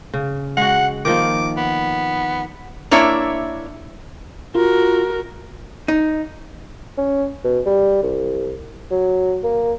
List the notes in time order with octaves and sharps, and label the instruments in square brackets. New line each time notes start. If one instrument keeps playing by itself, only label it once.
[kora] C#3
[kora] G#3 F#4 [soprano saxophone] F#5
[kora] D#3 F3 A#3 [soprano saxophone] D6
[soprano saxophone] B3
[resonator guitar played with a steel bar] A#3 D4 E4 C#5 E5
[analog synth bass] F4 [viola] F#4 A#4
[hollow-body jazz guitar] D#4
[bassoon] C#4
B2
G3
C2
F#3
A#3